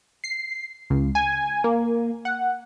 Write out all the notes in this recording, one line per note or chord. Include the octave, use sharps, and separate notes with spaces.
C7
C#2
G#5
A#3
F#5